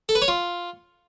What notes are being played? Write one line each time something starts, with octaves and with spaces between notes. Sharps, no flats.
A4
B4
C#5
F4